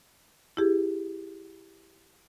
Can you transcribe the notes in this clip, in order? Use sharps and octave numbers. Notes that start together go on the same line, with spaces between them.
E4 G4 G#4